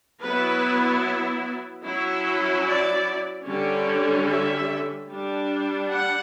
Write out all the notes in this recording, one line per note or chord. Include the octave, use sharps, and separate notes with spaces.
F#3 B3 E4 B4
F#3 C#4 E4
D5
D3 G3 C#4
E5
G3 D4
F#5